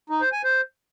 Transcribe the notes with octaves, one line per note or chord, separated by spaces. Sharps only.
D#4
C5
G#5
C5